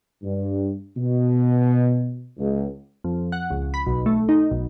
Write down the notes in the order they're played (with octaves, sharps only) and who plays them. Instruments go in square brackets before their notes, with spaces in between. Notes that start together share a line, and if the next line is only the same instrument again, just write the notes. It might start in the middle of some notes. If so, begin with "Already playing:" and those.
[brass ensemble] G2
B2
C#2
[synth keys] F2
F#5
C#2
B5
B1
A3
D#4
B1